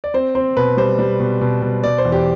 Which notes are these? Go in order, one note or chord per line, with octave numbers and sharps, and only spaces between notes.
D5
C4 C5
C4 C5
B2 B4
G3 C5
G3
B2
B2
B2
B2 D5
C5
E2
G4